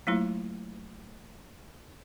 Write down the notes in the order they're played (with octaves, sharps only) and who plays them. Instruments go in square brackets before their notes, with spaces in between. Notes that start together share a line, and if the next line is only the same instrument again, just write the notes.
[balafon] F#3 A3 A#3 E4 F4